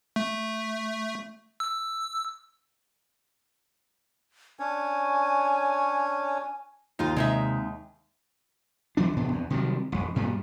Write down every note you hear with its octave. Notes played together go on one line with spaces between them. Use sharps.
A3
E6
C#4 D4 C#5 G#5
D#2 D#4 F4
C3 G#3 D#4 E5
E3 F#3 D4
A2 C3 B3 D4
E2
C3 D#3 F#3 G3
A1 F2
D2 G2 A#2 G3